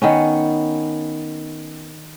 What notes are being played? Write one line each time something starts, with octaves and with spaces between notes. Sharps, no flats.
D#3 B3 C#4